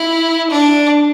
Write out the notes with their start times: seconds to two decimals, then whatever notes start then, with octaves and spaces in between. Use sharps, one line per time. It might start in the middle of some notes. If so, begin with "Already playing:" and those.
Already playing: E4
0.50 D4